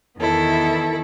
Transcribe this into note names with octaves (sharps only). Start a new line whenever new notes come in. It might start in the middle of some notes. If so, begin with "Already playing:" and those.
E2 D#3 B3 E4 A4